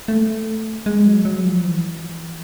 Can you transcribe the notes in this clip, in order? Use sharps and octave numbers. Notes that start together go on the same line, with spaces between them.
A3
G#3
F#3
F#3
F3
E3